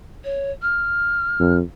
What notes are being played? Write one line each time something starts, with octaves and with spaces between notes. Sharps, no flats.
C#5
F6
F2